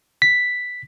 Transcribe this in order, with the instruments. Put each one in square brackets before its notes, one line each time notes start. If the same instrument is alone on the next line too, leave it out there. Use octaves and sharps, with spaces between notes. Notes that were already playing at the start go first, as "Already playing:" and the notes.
[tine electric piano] B6